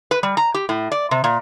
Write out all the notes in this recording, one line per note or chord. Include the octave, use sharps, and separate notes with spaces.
B4
G3
A#5
G4
A2
D5
C3
A#2